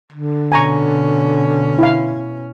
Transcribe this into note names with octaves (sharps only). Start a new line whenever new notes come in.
D3
B2 C#4 G#5 A#5 C#6
E4 F5